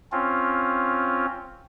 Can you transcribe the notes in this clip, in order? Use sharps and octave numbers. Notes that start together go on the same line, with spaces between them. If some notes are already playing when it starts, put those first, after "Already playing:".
C4 C#4 F4